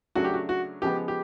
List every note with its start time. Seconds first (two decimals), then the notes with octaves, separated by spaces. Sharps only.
0.15 C#3 F#3 A3 D4 F#4
0.25 G4
0.34 F#4
0.49 F#4
0.82 C#3 F3 G#3 B3 G4
1.08 G4